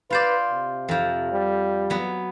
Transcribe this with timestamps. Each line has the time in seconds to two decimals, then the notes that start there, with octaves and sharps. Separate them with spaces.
0.10 F4 B4 C5 D5
0.51 C3
0.89 F2 F3
1.31 G3
1.90 F#3 B3